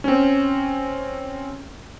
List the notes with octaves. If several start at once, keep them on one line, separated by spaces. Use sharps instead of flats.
C4 C#4